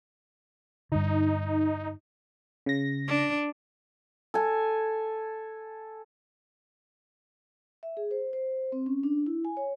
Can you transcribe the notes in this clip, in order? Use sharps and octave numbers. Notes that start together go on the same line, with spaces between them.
G2 D3 D#4
C#3 A#6
D4
A4 G#5
E5
G#4
C5
C5
C4
C#4
D4
E4
G#5
C#5